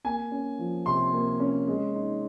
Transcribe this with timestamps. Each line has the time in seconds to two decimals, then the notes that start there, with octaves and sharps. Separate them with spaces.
0.04 A#3 G#5
0.31 C#4
0.59 F3
0.86 C3 C6
1.13 A#3
1.40 C#4
1.68 G#3
1.95 D#4